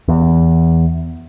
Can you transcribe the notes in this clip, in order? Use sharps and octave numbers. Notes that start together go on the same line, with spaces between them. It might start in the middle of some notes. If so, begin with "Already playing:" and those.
E2